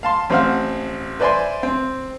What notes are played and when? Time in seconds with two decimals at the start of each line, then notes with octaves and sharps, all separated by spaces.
0.03 F5 A5 C6
0.30 A1 C4 C5 F5 F#5 F6
1.20 B4 C5 D5 E5 G#5 C6
1.63 C4